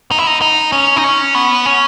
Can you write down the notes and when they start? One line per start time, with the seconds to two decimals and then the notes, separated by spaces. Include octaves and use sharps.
0.11 D#4
0.18 E4
0.27 D#4
0.42 D#4
0.72 C#4
0.96 D#4
1.04 C#4
1.35 B3
1.66 C#4